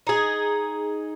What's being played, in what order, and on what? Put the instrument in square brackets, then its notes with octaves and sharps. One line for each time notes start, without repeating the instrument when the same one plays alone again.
[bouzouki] D#4 G#4